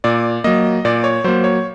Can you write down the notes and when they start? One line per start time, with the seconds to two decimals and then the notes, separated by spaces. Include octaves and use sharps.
0.04 A#2 D5
0.44 F#3 A#3 D#5
0.85 A#2 D5
1.04 C#5
1.24 F#3 A#3 C5
1.44 C#5